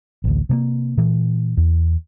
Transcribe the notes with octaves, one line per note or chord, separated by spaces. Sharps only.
A1 D2
C3 A3 A#3
A#2 E3
E2